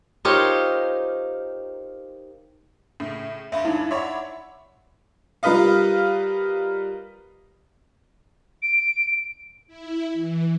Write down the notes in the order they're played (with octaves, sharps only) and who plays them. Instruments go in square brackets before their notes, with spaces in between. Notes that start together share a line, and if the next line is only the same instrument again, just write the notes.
[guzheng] D#4 F4 G4 A#4 C5 C#5
[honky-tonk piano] A2 C#3
[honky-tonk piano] D2 [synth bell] E5 F5 B5
[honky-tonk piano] G2 [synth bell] D#4 E4
[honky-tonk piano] C#5 D5 E5 [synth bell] F#5 B5 C6
[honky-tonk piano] G3 F4 A#4 B4 D#5 F5
[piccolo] D7
[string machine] E4
E3